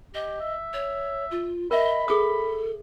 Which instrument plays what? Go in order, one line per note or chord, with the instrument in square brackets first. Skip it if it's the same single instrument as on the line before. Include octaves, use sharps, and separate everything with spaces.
[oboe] G4 [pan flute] D#5
[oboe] E5
[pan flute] C#5
F4
[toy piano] A#4 E5 [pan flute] D#5 [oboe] B5
[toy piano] G#4 D#6 [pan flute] A4